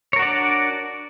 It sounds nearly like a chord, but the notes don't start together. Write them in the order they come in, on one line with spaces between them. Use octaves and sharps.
C#5 A#4 F#4 D5 D4